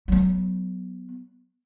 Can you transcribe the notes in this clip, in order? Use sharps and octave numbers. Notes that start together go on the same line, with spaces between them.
F#3 B3